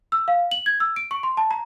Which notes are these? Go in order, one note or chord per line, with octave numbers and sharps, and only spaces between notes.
E6
F5
F#7
G#6
E6
D7
C#6
C6
A5
A#5